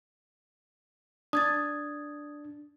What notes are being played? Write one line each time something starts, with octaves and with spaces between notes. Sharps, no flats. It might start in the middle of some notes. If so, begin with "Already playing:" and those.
D4 D#6 G#6 A6